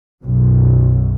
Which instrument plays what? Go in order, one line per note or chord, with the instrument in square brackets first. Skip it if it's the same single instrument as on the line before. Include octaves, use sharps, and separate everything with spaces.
[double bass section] B1 F#2